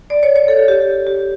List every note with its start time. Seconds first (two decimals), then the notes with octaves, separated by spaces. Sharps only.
0.10 D5
0.23 C#5
0.36 C#5
0.48 A4
0.68 G4
1.07 G4